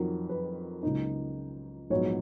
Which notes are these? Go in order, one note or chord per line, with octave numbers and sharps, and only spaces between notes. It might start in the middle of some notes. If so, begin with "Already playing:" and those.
Already playing: F2 D#3 F#3
B4
C#2 C#3 F#3 A#3 D#4
A#1 G#2 F#3 B3 C#5